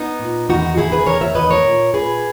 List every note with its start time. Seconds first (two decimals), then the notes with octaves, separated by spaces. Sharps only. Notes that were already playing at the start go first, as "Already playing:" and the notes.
Already playing: B3 D#4
0.20 A#2
0.49 E2 D#3 D#4 F#4
0.77 E2 D#3 E4 G#4
0.92 G#4 B4
1.07 E2 D#3 A#4 C#5
1.21 C#5 E5
1.35 E2 D#3 B4 D#5
1.50 A#4 C#5
1.64 A#2
1.94 A#2 G#4 B4